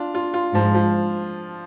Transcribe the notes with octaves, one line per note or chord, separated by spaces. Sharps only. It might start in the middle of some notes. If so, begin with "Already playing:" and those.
Already playing: D4 F4
F4
F4
G#2 F3
F3